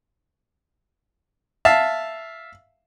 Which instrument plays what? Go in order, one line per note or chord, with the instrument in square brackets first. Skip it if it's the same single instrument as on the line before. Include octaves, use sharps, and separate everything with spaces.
[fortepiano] E5 F5 A5